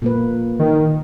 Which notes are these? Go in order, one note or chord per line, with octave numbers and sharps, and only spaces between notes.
A#2 A#3 B4
D#3